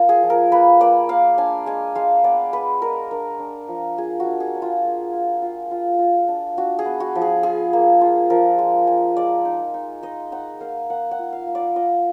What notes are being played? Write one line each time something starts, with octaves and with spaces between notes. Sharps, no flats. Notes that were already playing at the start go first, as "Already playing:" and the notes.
Already playing: A#3 F4
G#4
F3
A#4
A#3 B4
A#3 D5
A#3 F5
D4 G#5
G#3 G#5
G#3 F5
B3 D5
G#3 B4
G#3 A#4
D4 A#4
D4
F3
F4 G#4
F#4
D4
G#4
D4
F4
A#3
F4
F4
F4
F4
D4
D4 F#4
G#4
B3
F#4
F3
G#4
F4 G#4
A#3
F4
F3 A#4
G#3
G#3
G#3 D5
D#4
D#4
D#4 D#5
D#4 F#5
A#3 F5
A#3 F#5
F#5
F4
F5
A#3
D5
F4 D#5